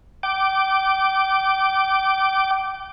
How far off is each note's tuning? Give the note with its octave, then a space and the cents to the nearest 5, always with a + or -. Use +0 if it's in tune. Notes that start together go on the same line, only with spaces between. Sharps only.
G5 -35 D6 +0